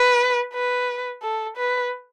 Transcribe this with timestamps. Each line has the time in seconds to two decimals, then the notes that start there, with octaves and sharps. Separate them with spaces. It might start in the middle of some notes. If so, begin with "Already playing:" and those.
Already playing: B4
0.54 B4
1.22 A4
1.57 B4